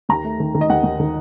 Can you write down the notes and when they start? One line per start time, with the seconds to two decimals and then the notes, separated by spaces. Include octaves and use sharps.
0.09 D#2 A#5
0.24 A3
0.40 D#3
0.55 D#3
0.61 D#5
0.70 D#2 F#5
0.83 D#2
1.00 D#3